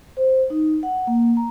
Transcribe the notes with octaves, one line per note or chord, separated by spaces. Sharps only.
C5
D#4
F#5
A#3
A#5